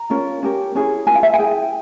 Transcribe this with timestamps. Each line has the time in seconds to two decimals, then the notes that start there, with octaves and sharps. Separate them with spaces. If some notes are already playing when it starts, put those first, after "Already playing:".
Already playing: A#5
0.10 C#4 F4 A#4
0.43 C#4 G4 A#4
0.75 C#4 E4 G#4
1.07 F4 A#4 G#5
1.15 F5
1.23 E5
1.34 G#5
1.39 E4 G#4 G5